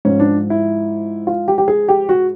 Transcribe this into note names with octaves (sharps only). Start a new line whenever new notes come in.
G#2 F3 C#4
D4
E4
F4
G4
G4
G#4
G4
F#4